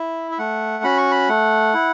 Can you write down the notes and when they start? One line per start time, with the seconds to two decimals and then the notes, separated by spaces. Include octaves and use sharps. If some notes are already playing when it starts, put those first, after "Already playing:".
Already playing: E4 E5
0.32 E5
0.39 A3 F#5
0.84 C#4 F#4 B5
0.98 C#6
1.11 B5
1.29 A3 F#5
1.74 E4